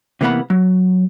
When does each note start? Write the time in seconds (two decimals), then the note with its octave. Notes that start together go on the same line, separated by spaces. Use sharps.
0.21 C3 E3 A#3 B3 F#5 B5
0.50 F#3